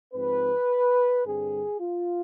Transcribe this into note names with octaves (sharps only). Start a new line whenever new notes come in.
G#2 F3 C4 B4
G2 D3 G3 C4 G#4
F4